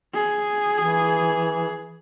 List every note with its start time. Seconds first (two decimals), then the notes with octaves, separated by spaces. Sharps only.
0.14 G#4
0.76 E3